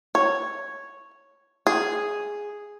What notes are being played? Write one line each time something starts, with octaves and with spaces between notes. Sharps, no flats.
C#5
G#4